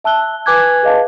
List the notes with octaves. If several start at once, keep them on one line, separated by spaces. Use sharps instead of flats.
E5 A5 E6 F#6 G7
B4 G#5 D6 F#6 G#6
G#4 B4 D#5 F5 A5